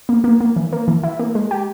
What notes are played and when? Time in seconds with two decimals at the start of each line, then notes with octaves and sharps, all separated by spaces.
0.09 A#3
0.24 A#3
0.40 A#3
0.56 E3
0.72 A#3
0.88 E3
1.04 E4
1.19 A#3
1.35 G#3
1.51 G4